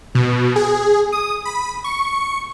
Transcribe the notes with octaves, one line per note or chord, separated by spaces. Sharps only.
B2
G#4
D#6
B5
C#6